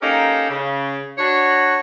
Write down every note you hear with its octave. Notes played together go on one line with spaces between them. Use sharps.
A#3 C#4 D#4 G4 A4 A#4
C#3
D4 F#4 C#5